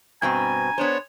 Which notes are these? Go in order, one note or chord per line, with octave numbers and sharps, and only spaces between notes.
G2 B2 C4 G#5 A#5
B3 D4 C5 C#5